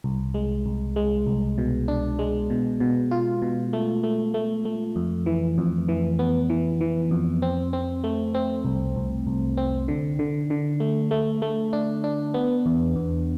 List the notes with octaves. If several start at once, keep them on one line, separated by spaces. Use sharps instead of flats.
C2
G#3
C2
G#3
C2
B2
D4
G#3
B2
B2
F4
B2
A3
A3
A3
A3
F2
E3
F2
E3
B3
E3
E3
F2
C4
C4
A3
C4
C2
C2
C2
C4
D3
D3
D3
A3
A3
A3
D4
D4
B3
E2
E2